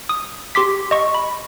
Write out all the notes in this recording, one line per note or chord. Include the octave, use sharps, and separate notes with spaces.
D#6
G4 C6 D6 B6
D#5 C#6
B5